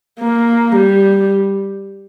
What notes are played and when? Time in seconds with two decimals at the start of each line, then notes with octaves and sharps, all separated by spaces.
0.20 A#3
0.75 G3